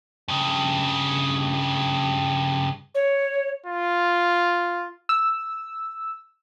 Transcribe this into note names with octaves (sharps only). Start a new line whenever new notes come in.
G2 C#3
C#5
F4
E6